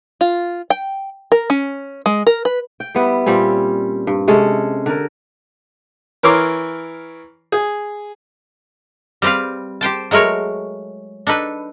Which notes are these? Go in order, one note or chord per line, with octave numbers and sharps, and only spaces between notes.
F4
G5
A#4
C#4
G#3
A#4
B4
G5
G3 B3 E4
A#2 G3 C4 C#4
G2
C3 G#3 C#4 A4
D3 A#4
E3 A#4 C#5 C6 D6 F6
G#4
G3 C4 G4 B4 F5
G4 C5 G5 A5
F#3 G#3 A3 A#4 C#5
D4 D#4 A4 B4